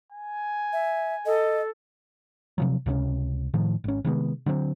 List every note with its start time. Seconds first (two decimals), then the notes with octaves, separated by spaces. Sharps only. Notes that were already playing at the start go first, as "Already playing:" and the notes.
0.13 G#5
0.73 E5
1.26 A4 D#5
2.58 C3 F3 F#3
2.86 C#2 C3 C4 C#4
3.54 A2 D#3 F3
3.84 G#1 C#4
4.04 C3 D#3 G#3 B3
4.46 D3 F#3 A3 C4